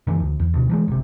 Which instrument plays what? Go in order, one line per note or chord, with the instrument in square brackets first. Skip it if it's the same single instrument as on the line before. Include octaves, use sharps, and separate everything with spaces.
[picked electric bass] F#2 D#3 E3
D2
E2
D2 B2
E3 F3 G#3
G1 C3